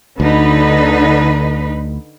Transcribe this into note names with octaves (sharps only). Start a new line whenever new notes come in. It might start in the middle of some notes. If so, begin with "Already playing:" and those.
D2 D3 D#4 B4